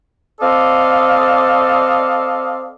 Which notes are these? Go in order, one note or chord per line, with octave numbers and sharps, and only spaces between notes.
C4 A4 D5 D#5 F5